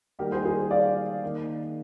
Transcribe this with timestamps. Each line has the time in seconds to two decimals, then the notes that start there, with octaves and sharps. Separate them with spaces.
0.19 D#3 G3 A#3 G4 A#4
0.32 G#4 C5
0.45 G#4 C5
0.71 D5 F5
1.23 D#3 A#3